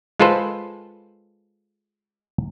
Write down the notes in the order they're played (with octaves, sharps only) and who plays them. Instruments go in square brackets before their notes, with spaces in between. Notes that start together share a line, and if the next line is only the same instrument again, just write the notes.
[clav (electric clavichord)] G#3 F4 A4 B4 C5